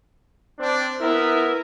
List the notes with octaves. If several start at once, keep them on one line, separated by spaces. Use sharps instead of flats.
C4 D4
B3 E4 A#4 E5